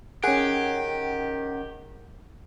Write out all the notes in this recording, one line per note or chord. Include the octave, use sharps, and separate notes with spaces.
D#3 C#4 G4 G#4 F#5